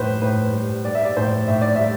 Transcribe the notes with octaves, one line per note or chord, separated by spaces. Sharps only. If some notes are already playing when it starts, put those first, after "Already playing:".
Already playing: A2 G3 B4 C5
A2 B4
G3
G3 D5
E5
D5
A2 C5
A2 E5
D5
G3 E5